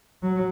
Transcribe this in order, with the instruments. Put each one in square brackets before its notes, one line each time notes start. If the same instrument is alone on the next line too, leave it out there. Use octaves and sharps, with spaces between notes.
[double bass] F#3